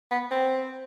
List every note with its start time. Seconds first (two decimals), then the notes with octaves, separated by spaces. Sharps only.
0.11 B3
0.31 C4